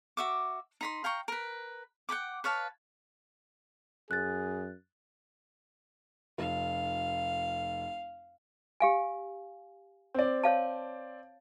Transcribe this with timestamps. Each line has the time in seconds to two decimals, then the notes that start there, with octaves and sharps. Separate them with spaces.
0.17 F#4 E5 D6
0.81 D#4 B5 C6
1.04 F5 G5 A#5 C#6
1.28 A#4 B4
2.09 F#5 G5 B5 D6
2.44 B4 C#5 F5 A5
4.11 F#2 G#4 F#6 A6
6.38 F1 F5
8.80 G4 F5 G#5
10.14 C4 D5
10.44 C#5 F5 A5